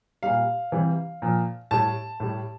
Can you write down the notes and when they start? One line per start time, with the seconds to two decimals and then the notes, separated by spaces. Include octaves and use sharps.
0.23 A#2 G3 F5
0.72 C3 E3 G3
1.22 A#2 F3
1.71 A2 G3 A5
2.20 A2 G3